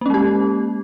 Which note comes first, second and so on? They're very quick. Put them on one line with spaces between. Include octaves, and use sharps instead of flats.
A#3 C#4 G#3 G4